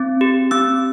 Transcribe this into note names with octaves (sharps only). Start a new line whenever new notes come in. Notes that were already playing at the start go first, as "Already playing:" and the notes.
Already playing: C4
G4
C4 E6